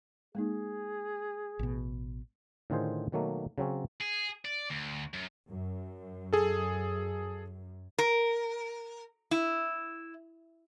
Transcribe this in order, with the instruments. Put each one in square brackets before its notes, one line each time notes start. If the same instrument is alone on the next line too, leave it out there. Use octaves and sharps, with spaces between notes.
[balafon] G#3 A#3 D#4 [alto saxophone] G#4
[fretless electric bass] A1 B2
[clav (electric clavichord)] A2 D3 D#3 F4 G#4 C5
B2 D#3 F#3 A3 A#3
C#3 F#3 C4 C#4
[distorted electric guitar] G#4
D5
D2
F#2
[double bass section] F#2
[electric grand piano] G#4 A4
[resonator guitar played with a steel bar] A#4
E4